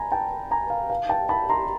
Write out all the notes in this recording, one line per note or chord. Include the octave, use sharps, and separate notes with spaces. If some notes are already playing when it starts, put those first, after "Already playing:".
Already playing: G#5 A#5 B5
G5 A5
G#5 A#5
F5
F5
G5 A5
A5 B5
A#5 C6